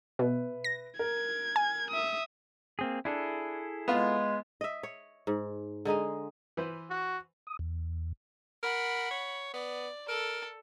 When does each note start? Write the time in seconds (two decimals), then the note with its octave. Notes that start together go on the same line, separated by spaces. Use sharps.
0.19 B2 B4 E5
0.64 A#6
0.99 A#4 G#6
1.56 G#5
1.91 E5 D#6
2.79 A#3 C4 G#4
3.05 D4 E4 G#4 A4
3.88 G#3 B3 F4
4.61 D#5 E5
4.83 C#5
5.27 G#2
5.85 D3 G#3 D#4 G#4
6.57 E3 B4 C5
6.90 F#4
7.47 D#6
7.59 E2
8.63 A#4 F#5 B5
9.11 C#5
9.54 B3 D5
10.08 A4 A#4